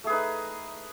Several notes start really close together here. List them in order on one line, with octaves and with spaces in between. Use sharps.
A3 G#4 B4 D#4